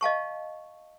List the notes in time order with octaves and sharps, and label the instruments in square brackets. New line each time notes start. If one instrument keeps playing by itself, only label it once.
[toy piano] D#5 F5 A5 C#6